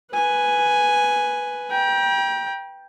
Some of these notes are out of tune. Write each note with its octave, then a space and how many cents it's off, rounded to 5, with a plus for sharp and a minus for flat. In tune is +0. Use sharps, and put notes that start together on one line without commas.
B4 +0 G#5 +0
G5 +5 A#5 +45